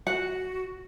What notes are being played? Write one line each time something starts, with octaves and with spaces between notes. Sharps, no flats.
F#4 F#5